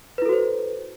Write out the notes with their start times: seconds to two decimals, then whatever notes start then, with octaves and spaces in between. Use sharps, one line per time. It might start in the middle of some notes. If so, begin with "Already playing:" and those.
0.18 B4
0.22 E4
0.25 A4
0.29 F#4
0.33 C5